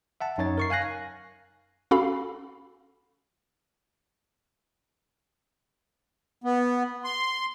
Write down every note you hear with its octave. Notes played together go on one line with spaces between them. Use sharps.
E5 F#5 A5
F#2 D#4 C#5 A6
A#4 C#6 C7
F5 G#5 F#6 A#6
C#4 F#4 A4 F5 B5
B3
C6